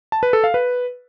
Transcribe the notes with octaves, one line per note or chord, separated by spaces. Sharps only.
A5
B4
A4
F5
B4